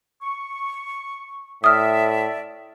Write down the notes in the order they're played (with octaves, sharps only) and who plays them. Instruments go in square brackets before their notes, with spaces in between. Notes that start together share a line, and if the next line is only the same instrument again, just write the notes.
[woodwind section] C#6
[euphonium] A2 [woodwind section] D5 E5 [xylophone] D#6 F6